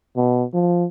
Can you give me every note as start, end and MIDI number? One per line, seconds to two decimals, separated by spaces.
0.17 0.44 47
0.54 0.85 53